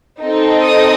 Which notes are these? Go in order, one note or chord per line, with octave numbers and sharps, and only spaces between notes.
C4 D#4 A4
D#6